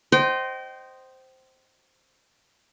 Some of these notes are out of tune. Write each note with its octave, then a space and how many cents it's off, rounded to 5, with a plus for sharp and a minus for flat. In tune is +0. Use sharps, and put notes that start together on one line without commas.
C5 +0 D#5 -10 G5 -30